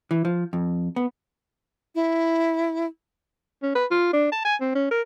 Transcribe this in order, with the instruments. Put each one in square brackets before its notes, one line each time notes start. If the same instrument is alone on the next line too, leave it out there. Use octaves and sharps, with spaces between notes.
[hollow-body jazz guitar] E3
F3
F2
B3
[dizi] E4
[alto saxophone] C#4
B4
F4
D4
A5
G#5
C4
C#4
A#4